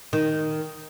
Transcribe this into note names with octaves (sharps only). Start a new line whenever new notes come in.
D#3